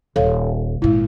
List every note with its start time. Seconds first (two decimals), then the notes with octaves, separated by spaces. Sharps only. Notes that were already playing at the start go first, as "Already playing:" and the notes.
0.16 D#1 A4 C#5 F5
0.82 G#1 A#2 G#3 E4